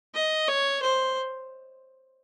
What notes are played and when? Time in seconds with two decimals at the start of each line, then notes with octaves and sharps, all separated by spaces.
0.14 D#5
0.48 C#5
0.82 C5